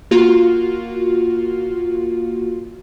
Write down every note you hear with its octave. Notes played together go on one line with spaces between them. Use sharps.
A#3 F4 F#4